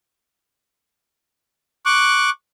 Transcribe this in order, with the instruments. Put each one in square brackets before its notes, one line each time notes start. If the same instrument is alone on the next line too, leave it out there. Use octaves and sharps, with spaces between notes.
[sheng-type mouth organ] C#6 D6 F#6